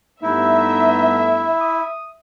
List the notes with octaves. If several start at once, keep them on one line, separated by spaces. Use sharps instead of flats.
G2 A3 B3 D#4 E4 E5
D#6